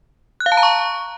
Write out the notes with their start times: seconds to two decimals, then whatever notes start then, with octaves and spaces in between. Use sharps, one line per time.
0.40 F#6
0.46 F5
0.52 A5
0.57 A#5
0.63 C#6